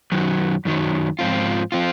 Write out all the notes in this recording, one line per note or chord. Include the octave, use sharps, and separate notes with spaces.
F#2 D#3 F#3
F#2 D#3 F#3
G#2 F3 C4 F4
F3 C4 F4